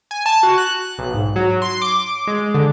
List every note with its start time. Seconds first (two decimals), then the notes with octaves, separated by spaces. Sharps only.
0.11 G#5
0.26 A5
0.43 F#4
0.58 F#6
0.98 B1
1.14 G#2
1.36 F#3
1.62 C6
1.82 D6
2.27 G#3
2.54 D3